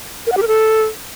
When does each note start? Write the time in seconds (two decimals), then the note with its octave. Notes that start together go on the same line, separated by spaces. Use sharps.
0.27 A#4
0.32 F#5
0.37 G4
0.42 A#4
0.48 A4